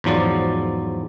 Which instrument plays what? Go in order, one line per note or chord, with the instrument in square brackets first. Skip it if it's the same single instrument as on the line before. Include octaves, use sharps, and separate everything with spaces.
[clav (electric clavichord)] E2 G#2 F3 F#3 D5